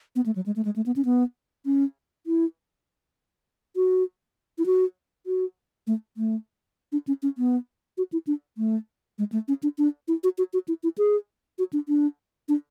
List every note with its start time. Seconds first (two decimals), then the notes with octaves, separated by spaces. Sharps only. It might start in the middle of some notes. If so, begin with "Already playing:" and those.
0.16 B3
0.26 A3
0.36 F#3
0.46 G#3
0.56 A3
0.65 G#3
0.76 A3
0.86 B3
0.96 C#4
1.05 B3
1.66 C#4
2.27 E4
3.76 F#4
4.58 E4
4.66 F#4
5.27 F#4
5.87 A3
6.17 A3
6.92 D4
7.07 C#4
7.23 C#4
7.38 B3
7.98 F#4
8.13 E4
8.27 D4
8.58 A3
9.18 G#3
9.32 A3
9.48 C#4
9.63 D4
9.78 D4
10.08 E4
10.24 F#4
10.38 F#4
10.53 F#4
10.68 E4
10.83 E4
10.98 G#4
11.59 F#4
11.73 D4
11.88 D4
12.49 D4